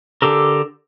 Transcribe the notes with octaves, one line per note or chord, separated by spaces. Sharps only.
D3 G4 A4 A#4